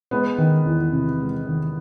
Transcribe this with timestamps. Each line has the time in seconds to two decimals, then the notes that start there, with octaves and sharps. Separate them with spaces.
0.11 G#3 B3
0.38 D#3
0.65 E2
0.92 C3
1.20 G#3
1.46 D#3